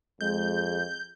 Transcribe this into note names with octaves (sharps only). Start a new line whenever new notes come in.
F2 G#3 G6